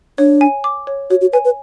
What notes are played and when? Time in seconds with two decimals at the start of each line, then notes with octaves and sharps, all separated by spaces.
0.18 D4 C#5
0.41 G#5
0.64 D6
0.87 C#5
1.10 F#4 C#5
1.21 F#4
1.33 B4 G#5
1.45 B4